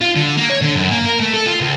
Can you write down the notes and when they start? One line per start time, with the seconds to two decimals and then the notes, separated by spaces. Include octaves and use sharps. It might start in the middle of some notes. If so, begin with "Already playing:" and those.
0.01 F4
0.16 D3
0.37 A#3
0.50 C#5
0.62 D3
0.76 F#2
0.91 A#3
1.06 A#4
1.20 A3
1.34 A4
1.46 F4
1.61 C#2